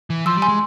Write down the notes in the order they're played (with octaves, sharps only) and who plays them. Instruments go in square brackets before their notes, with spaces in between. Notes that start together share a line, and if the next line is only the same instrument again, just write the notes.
[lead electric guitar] E3
[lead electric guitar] F3 [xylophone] C6 E6
[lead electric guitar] G3
[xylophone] G#5 C6
[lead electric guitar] G#3